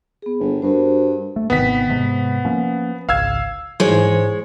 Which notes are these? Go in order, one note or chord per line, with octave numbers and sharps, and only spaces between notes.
B3 G#4
G1
G2 F#4 A#4 C5
A3
G#1 C3 D#3 B3 B6
G#2 C3 G#3
F3 A#3 C#4
G#1 C#2 F5 E6 G#6
G#2 E3 G#3 C5 C#5